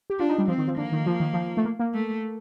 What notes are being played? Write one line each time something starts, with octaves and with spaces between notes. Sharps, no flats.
G4
D4 F4
D#4
G3
F3 C4
D#3
F3
D3 A#3
D#3
F3
D#3
F3
A3
A#3
A#3
A3